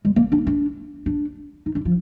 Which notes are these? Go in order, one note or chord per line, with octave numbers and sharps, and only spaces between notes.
G#3
A#3
D4
D4
D4
D#4
D4
F3